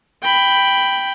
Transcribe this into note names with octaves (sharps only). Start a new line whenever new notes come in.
G5 B5